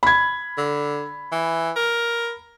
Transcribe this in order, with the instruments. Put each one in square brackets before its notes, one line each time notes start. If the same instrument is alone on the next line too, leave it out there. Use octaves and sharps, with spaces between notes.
[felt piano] B5 G#6
[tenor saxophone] D3
E3
A#4